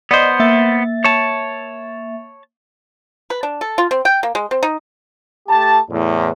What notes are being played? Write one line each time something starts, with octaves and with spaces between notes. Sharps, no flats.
B3 C5 D5 D#5
A#3 E5 A6
C#5 A5
B4
D4
A4
F4
C4
G5
A#3
G#3
C4
D#4
A3 G4 A5
E2 A2